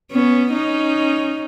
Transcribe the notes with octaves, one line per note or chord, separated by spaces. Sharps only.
B3 C#4
C#4 D#4